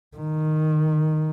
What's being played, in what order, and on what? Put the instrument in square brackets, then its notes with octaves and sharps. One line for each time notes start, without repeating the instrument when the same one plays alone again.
[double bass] D#3